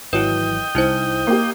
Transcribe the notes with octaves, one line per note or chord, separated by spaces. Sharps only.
G#1 E3 F#3 E4 B4 D#5 G5
C2 D#4 E4 C5
A#3 G4